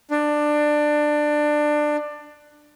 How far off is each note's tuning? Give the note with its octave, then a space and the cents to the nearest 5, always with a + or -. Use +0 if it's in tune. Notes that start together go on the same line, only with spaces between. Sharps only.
D4 +20